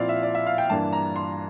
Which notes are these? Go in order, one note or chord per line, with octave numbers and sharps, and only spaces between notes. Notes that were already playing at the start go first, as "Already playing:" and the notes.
Already playing: A#2 F3 C4 E4 D5 F5
E5
D5
E5
F5
G5
G2 E3 A#3 D4 A5
A#5
C6